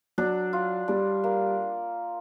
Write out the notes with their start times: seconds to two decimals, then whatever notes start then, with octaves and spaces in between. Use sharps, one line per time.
0.18 F#3 D4
0.53 F4
0.88 G3 D4
1.24 A#3